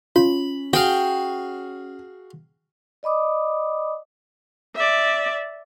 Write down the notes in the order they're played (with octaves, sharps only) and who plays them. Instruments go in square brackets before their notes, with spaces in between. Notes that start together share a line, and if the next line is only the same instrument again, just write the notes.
[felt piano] C#4 [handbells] F4 [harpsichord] B5
[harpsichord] F#4 G#4 F5 [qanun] G5
[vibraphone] D5 D#5 B5 D6 D#6
[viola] D5 E5